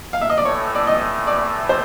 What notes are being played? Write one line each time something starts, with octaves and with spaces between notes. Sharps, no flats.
F5
E5
D#5
D5
A2 E3 A3 C#5
D5
D#5
D5
C5